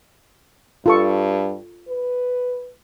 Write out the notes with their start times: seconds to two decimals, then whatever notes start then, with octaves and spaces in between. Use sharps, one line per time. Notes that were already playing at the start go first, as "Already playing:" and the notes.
0.86 G2 F4 A4 C#6
1.88 B4